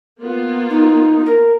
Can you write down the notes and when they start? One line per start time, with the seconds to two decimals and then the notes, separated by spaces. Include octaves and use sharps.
0.19 A#3 B3 F4
0.70 D#4
1.26 A#4